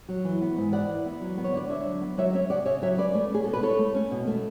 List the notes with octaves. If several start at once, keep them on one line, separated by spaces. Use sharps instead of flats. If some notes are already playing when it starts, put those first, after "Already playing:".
F#3
E3
B3
G#2
E4 D5 F#5
E3
B3
F#3
B3
C#5
D3 D5
D4 C#5 E5
F#3
B3
F#3 C#5 E5
C#4 C#5 E5
C#3 D5 F#5
C#3 C#5 E5
F#3 C#5 E5
C#4 B4 D5
A3
C#4 G#4
B2 A4
B4
E4 A4 C#5
A3
C#4
B2
A3